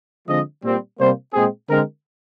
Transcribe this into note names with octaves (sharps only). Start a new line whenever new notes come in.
D3 F3 G#3 C4 D#5
A#2 G3 C4
C3 G3 A#3 C5
A#2 G#3 C4 G#4
D3 G#3 C4 A#4